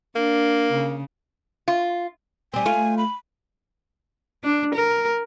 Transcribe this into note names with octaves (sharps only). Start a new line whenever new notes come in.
A#3 D4
C#3
F4
G3 C4 G#5
A3 F4
B5
D4
A#4